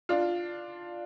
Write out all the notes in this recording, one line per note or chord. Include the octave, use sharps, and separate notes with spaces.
D4 F4